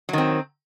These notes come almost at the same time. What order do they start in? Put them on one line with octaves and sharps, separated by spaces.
F#3 D#3 C4